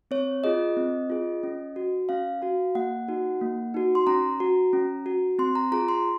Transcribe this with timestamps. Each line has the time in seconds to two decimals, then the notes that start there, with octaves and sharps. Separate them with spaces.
0.11 C4 C#5
0.44 F4 G#4 D#5
0.77 C4
1.10 F4 G#4
1.43 C#4
1.76 F#4
2.09 C#4 F5
2.42 F#4 F5
2.75 A#3 F#5
3.08 D#4 F#4
3.41 A#3
3.74 D#4 F#4
3.95 C6
4.07 C#4 A#5
4.40 F#4
4.73 C#4
5.06 F#4
5.39 C4 C6
5.55 A#5
5.72 F4 G#4 A#5
5.88 C6